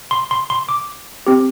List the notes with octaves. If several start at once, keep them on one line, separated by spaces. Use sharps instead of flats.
C6
C6
C6
D6
C4 G4